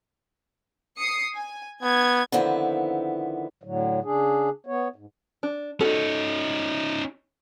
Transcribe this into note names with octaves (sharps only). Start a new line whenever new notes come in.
D#6 C7 C#7
G#5
B3 G#6
D3 D#3 F3 B3 C4 E4
A2 D3 F#3
C#3 D4 G#4
B3 C#5
G#2
D4
C#4 D#4 F#4 A4